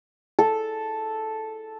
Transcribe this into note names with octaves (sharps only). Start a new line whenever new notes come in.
A4